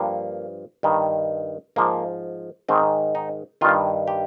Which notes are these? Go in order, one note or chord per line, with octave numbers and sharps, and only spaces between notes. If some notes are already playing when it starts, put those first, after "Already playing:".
Already playing: G2 F3 A#3
G2 D#3
G#2 F3 A#3
G#2 D#3 C4
D#4
G2 D#3 F4
G4